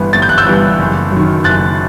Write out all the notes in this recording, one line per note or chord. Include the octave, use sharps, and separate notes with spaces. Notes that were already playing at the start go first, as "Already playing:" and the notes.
Already playing: G1 G2 E3 G3 B3
G1 A6
G6
F#6
E6 G6
G2 E3 G3 B3
F#1
F#2 D#3
F#1 F#6 A6